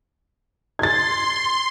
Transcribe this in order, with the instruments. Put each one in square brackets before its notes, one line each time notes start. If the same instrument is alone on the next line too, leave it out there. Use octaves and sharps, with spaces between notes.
[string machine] C6 [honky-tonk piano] G#6 A6